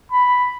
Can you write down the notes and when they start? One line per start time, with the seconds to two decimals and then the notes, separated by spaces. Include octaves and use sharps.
0.12 B5